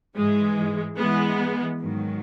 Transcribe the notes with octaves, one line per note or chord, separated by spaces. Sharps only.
G#2 E3 G#3
E3 G#3 B3
G#2 D#3 F#3